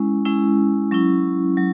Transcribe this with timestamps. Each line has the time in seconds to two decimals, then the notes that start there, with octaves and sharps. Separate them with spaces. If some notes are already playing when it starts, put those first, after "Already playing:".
Already playing: G#3 C#4 E4
0.25 G#3 C#4 E4
0.91 F#3 C#4 E4
1.57 F#3